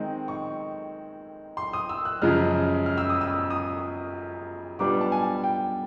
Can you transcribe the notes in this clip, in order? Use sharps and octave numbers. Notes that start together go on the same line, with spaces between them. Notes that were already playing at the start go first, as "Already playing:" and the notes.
Already playing: D#3 G#3 C4 D#4
C#6
C6
D#6
E6
F#6
F#2 C#3 F3 G#3 F6
F6
E6
D#6
E6
D#6
B2 G3 B3 D4 F4 D6
A5
G#5
G5